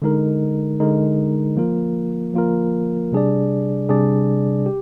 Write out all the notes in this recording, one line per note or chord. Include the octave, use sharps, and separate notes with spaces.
D3 G#3 D#4 A#4
D3 G#3 D#4 A#4
F3 A#3 F4 A#4
F3 A#3 F4 A#4
C3 G3 D4 G#4 D5
C3 G3 D4 G#4 D5
G4